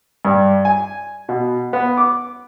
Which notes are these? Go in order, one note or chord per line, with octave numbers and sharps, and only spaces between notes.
G2
G#5
B2
B3
D6